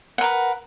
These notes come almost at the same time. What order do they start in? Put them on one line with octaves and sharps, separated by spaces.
F#5 A#4 B4